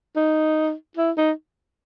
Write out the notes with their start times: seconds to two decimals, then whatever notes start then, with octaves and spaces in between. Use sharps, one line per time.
0.16 D#4
0.97 E4
1.18 D#4